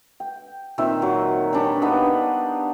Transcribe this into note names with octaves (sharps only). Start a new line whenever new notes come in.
G5
A#2 D#3 C4 E5
F#3
G3 C#4 D4
B3 D4 D#4 F5